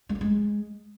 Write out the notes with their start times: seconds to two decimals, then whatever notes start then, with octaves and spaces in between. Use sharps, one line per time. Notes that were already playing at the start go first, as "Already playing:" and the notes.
0.09 G#3
0.15 F#3
0.21 G#3